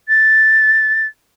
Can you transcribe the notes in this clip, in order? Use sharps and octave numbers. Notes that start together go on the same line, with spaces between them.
A6